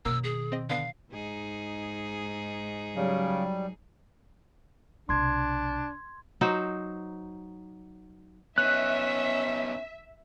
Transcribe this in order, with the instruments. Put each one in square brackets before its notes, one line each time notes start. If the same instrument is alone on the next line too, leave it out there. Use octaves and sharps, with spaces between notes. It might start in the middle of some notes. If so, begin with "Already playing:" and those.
[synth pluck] F#2 A#3 [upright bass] B2 D#3 [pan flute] E6
[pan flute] G#4
[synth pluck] C4 D#5
[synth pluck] D3 B3 [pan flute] F5
[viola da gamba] G#2 D#4 G#4
[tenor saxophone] C#3 [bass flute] F#3 [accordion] G3
[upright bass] B1 C3 [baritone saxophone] D4 [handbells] C6 G#6
[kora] F#3 D#4 C5
[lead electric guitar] B3 D#4 [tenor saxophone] C#4 [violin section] E5 [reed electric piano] F#6